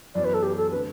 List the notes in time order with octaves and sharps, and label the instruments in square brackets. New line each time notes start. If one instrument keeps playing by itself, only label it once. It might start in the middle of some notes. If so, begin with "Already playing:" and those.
[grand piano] F#2 E3 B3 [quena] D5
[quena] B4
A4
G4
A4
[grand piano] D3 A3 C4 [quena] B4